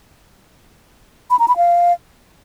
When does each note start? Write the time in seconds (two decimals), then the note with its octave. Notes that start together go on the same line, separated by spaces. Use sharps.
1.30 B5
1.39 A#5
1.48 B5
1.57 F5